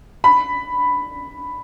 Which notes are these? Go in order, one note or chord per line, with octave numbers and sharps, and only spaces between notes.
B5